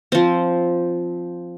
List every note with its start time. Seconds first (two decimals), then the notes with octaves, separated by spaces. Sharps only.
0.12 F3 C4